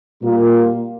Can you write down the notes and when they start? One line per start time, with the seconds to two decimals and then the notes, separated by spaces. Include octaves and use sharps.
0.22 A#2 G3 A#3 F4